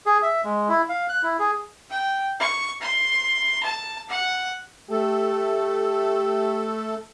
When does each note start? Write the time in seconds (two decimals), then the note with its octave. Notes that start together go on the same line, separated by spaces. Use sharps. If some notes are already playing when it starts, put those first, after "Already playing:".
0.06 G#4
0.23 E5
0.45 G#3
0.69 E4
0.89 F5
1.09 F#6
1.23 E4
1.39 G#4
1.90 G5
2.40 C#6
2.81 C6
3.63 A5
4.09 F#5
4.90 A3 G4 A4